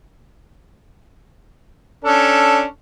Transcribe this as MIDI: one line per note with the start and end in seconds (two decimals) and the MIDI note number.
2.04 2.63 61
2.04 2.63 62
2.04 2.63 69